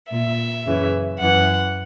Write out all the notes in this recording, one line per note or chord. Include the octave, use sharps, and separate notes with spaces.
A#2 E5
F#2 C#3 E3
F#2 E3 F#5